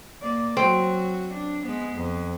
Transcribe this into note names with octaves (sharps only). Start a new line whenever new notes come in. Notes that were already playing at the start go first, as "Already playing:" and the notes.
A#3 D5
F#3 C4 F#4
D4
G#3 B3
F2